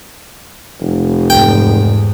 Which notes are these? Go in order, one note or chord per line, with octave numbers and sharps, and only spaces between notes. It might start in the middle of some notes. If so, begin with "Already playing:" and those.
F1
E2 G#2 G5